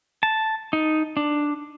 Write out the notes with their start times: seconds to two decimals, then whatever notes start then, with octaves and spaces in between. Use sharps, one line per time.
0.23 A5
0.73 D#4
1.17 D4